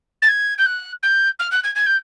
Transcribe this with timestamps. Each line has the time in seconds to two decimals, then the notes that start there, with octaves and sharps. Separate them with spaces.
0.22 A6
0.28 G#6
0.58 G6
0.66 F#6
1.02 G6
1.39 F6
1.51 F#6
1.63 G#6
1.75 G#6
1.86 G6